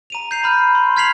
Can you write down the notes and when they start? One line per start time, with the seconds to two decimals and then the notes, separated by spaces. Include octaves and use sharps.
0.10 A#5 D#7 F7
0.31 G6 C7 F7
0.43 A#5 B5 F6
0.75 C6
0.97 F6 G#6 B6 C7 F7 F#7